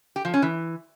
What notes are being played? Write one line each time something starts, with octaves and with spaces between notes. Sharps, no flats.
G4
F3
C#4
E3